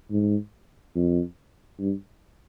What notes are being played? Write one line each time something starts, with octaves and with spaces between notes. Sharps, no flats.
G#2
F2
G2